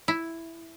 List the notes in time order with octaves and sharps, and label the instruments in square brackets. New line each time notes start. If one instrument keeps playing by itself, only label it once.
[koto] E4